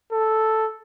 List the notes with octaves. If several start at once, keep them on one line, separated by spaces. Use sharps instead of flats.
A4